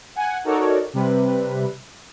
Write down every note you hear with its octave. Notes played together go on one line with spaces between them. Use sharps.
F#5 G#5
D#4 F#4 A4 A#4 C#5 D5
C3 G3 B4